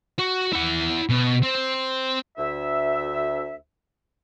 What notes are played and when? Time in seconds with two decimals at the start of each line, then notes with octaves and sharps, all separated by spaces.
0.19 F#4
0.53 E4 F#5
1.09 B2
1.43 C4
2.38 D2 E5